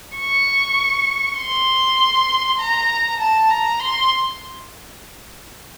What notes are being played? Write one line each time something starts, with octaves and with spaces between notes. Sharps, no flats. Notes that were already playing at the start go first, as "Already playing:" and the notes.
C#6
C6
A#5
A5
A#5
C6